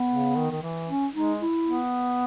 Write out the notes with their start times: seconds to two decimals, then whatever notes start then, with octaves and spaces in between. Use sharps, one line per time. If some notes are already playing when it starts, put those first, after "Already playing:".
Already playing: B3
0.10 C#3
0.36 D#3
0.52 D#3
0.62 E3
0.89 C#4
1.14 G#3 D#4
1.41 E4
1.67 B3